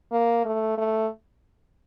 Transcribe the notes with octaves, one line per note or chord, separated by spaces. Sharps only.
A#3
A3
A3